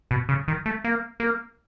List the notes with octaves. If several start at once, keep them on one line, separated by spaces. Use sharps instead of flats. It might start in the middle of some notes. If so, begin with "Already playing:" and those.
B2
C#3
D#3
A3
A#3
A#3